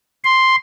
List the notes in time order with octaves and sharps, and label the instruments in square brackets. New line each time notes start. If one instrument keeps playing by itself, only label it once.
[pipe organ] C6